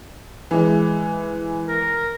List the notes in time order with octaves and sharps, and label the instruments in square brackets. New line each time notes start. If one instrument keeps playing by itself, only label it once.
[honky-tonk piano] E3 G#3
[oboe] A#4